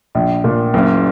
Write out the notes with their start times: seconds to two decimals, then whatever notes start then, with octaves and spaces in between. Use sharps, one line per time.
0.15 A#1
0.44 A#2
0.74 F#1